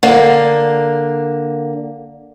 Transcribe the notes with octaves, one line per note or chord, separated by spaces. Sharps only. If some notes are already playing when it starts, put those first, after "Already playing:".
D3 A#3